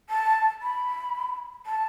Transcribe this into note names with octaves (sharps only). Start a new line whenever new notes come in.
A5
B5
A5